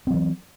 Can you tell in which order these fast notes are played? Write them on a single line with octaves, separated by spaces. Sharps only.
C4 F#3 E3